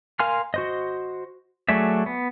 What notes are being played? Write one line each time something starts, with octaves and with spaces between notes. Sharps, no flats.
A#4 F5 G#5 C6 F6
F#4 C5 D#5
F#3 A3 G#4 D5 E5
B3